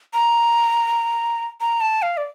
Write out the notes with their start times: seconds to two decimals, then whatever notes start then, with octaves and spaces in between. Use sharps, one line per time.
0.14 A#5
1.61 A#5
1.81 A5
2.02 F5
2.17 D5